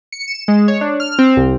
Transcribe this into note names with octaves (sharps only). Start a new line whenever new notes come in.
C#7
E7
G#3
C#5
D4
F6
C4
C2